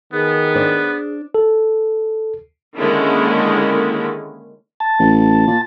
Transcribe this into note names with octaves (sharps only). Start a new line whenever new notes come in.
D#3 B3 G#4
D4 C5 D5
A4
D3 D#3 G#3 A#3 C#4 E4
A5
A1
A#2